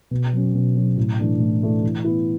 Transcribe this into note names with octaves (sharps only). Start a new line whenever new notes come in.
B2
F#3 C#4
B2
F#3 C#4
A2
E3 A3 D4
A2
E3 A3 D4
E3
B3 E4